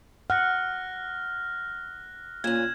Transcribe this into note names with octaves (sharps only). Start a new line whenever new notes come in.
F#5 F6 F#6 A#6
A#2 C#4 G#6 E7 F#7